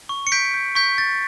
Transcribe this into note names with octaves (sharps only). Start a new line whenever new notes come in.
C#6
C#7
G6 B6 D7
G6
C#6 G6 B6
G6 A6